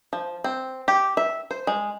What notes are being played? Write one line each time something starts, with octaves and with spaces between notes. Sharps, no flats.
F3
C4
G4
E5
C5
G#3